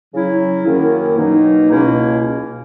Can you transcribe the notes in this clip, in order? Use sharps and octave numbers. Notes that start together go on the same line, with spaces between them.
C#3 F#3 C#4 E4
F#2 D#3 A#3 C#4 E4
B2 F#3 A#3 D#4
C#2 B2 A#3 C#4 E4